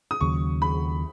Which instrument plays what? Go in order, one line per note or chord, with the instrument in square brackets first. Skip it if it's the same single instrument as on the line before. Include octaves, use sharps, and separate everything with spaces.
[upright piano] D#6
[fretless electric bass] D#2 C#3 F#3 [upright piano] C#6
[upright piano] B5